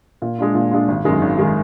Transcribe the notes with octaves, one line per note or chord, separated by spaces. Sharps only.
A#2
G#3 D4 F4
A#2
G#3 D4 F4
G#1
F#2 D#3 G#3
G#1
D#3 G#3